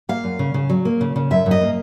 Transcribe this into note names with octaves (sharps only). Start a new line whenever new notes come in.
A#3 F5
F#2
C#3
C#3
F#3
A#3
C#3
C#3
F#2 E5
F#2
D#5
A#3